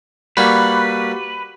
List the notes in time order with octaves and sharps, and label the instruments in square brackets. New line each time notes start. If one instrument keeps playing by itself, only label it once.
[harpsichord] G3 A#3 [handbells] F#4 G4 F#5 [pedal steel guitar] B4